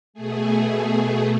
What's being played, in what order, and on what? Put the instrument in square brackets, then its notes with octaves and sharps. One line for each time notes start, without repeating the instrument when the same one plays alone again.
[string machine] B2 A3 G#4